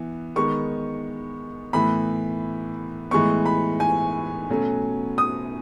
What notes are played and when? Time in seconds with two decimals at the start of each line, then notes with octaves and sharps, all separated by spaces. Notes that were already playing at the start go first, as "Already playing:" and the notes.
Already playing: E3 B3
0.36 D#3 G#3 B3 C#6
1.73 A2 E3 B3 B5
3.11 A2 E3 G#3 B3 C#6
3.46 B5
3.80 G#5
4.49 B2 F#3 A3 C#4
5.18 D#6